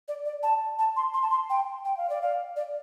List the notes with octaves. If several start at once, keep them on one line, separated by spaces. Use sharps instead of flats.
D5
D5
A5
A5
C6
C6
A5
C6
G5
G5
F5
D5
F5
D5